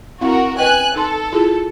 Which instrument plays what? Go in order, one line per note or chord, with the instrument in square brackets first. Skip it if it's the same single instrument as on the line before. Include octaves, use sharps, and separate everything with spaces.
[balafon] C4 E4 F5 [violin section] F#4 A#4
[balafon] B4 D#5 G5 [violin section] G#5 F#6
[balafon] D#4 C6 [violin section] A4
[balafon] E4 F4 G#4